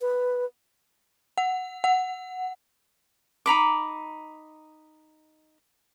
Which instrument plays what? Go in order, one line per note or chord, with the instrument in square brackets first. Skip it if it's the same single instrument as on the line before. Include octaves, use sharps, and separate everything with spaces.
[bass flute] B4
[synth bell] F#5
F#5
[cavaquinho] D#4 A#5 B5 D6